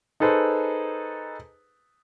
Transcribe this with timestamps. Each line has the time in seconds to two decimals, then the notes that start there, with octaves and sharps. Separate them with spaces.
0.20 D#4 G#4 A4 B4 C5